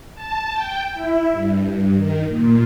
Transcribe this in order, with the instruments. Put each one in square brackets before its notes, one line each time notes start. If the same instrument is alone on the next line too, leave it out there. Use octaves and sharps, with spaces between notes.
[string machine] A5
G5
E4
G2
D#3
A#2